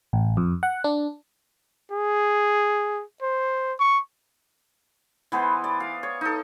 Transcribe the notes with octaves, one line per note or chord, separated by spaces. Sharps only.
A1
F2
F#5
D4
G#4
C5
C#6
E3 B3 G#4 C5
D5
F5
C#5
D#4 A4